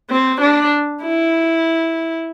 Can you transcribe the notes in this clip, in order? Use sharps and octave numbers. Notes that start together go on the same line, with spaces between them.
C4
D4
E4